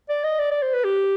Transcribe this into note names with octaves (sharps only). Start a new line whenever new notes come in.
D5
D#5
D5
D5
C5
B4
G4